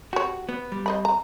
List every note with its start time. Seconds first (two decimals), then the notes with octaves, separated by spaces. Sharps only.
0.13 F#4 G4 C#5
0.49 B3
0.72 G3
0.86 C5 D#5 B5
1.05 A#5